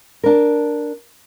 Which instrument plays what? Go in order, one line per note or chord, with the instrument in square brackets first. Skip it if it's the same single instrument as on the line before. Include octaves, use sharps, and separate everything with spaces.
[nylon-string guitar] D4 A#4